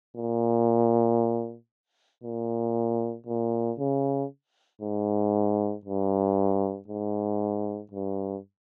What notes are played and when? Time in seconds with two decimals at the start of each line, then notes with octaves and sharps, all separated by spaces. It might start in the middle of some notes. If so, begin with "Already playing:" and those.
0.17 A#2
2.23 A#2
3.26 A#2
3.79 C#3
4.81 G#2
5.85 G2
6.88 G#2
7.91 G2